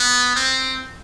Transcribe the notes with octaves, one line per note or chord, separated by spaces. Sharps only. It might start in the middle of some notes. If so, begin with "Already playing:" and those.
Already playing: B3
C4